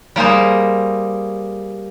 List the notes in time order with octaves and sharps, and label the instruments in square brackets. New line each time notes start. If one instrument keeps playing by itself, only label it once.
[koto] G3 A#3 G#4 C5